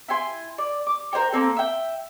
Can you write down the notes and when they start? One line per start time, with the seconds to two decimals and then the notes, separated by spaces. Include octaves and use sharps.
0.09 E4 G5 G#5 C6
0.58 D5
0.87 D6
1.13 A#4 C5 C#5 G5
1.32 A#3 C4 A4
1.56 E5 G5